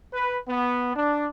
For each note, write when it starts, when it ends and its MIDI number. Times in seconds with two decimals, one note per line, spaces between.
0.14 0.39 71
0.48 0.92 59
0.96 1.27 62